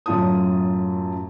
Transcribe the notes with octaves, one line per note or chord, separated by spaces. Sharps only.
F#2 A2 F4 A5 D#6